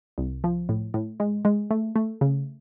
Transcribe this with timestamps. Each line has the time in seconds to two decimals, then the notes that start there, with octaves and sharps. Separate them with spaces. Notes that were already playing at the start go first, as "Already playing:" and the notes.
0.18 C2
0.44 F3
0.69 A2
0.94 A2
1.20 G#3
1.45 G#3
1.71 A3
1.96 A3
2.21 C#3